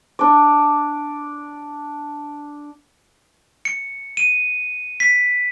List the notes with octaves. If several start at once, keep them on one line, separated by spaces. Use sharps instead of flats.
D4 D5
C#7
D#7
B6